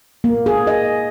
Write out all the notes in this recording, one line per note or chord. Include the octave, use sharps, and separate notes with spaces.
A#3
G#4
D#5